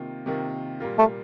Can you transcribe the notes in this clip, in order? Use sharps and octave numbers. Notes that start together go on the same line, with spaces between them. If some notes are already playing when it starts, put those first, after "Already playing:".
Already playing: C3 D#3 A#3 F4
C3 D#3 A#3 F4
A#2 G3 A#3 F4
A3